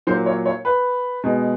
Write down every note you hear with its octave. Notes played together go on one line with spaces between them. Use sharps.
A#2 F#3 A#3 C5
C#5
C#5
B4
B2 G#3